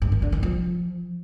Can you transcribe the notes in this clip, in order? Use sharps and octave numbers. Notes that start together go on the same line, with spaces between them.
G2
D#3
D3
D#3
F3